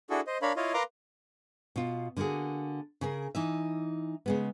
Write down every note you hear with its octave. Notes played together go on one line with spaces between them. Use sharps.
D4 E4 F#4 G#4 A4
C5 D#5
D4 A#4 C#5 F5 B5
E4 F4 C#5 D#5 F5
A#4 B4 F5 A#5 C6 D6
B2 F4
D3 A#3 F4 F#4 G#4
C#3 G#4 A#4
E3 D#4 E5
C#3 G#3 B3